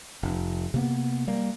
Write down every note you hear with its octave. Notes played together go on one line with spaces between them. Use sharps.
F1
C3 A#3 B3
G3 A#3